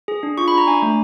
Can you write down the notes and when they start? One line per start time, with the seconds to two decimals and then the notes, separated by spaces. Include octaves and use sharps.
0.08 G#4
0.23 D4
0.38 F4 C#6
0.48 B5
0.52 D4
0.58 A#5
0.67 D4 G#5
0.82 A3